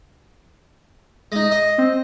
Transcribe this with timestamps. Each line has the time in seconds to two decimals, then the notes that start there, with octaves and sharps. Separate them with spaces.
1.32 G#3 D#4 A#6
1.51 D#5
1.78 C4